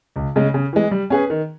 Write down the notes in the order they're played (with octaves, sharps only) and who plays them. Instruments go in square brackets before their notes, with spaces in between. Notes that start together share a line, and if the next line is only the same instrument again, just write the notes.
[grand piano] C#2
C#3 G#3
C#3
E3 G#3
G3
C#4 G#4 B4
D#3